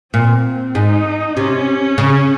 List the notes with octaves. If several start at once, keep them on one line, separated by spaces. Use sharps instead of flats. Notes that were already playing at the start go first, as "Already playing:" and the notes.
A#2 C4
G#2 D#4
C3 C#4
C#3